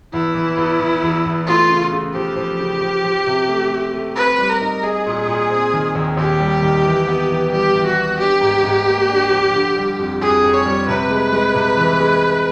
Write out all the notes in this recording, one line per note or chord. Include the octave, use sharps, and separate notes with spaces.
E2 E4
E3
E2
E3
E2
E2
A3 F4
C#3
C#3
F3 G4
F3
C#3
F3
F3
C3
A3
A3
A3
C4 B4
G3
A#4
D#4
D#4 G#4
A#2
A#2
C4
D#3
D#2
D#2 G4
G3
D#3
E3
B3
E3
G3 G4
E3
F#4
B3
D4 G4
G#2
G#2
A#3
D4
F3
D3
G3
F2
F2 G#4
F2
C#5
G3
C3 B4
G#3
G#3
C3
E3
G#3